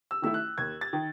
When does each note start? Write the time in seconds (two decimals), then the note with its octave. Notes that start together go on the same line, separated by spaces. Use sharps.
0.11 E6
0.22 D#3 A3 E4 E6
0.34 F#6
0.58 D#2 G#6
0.81 A6
0.93 D#3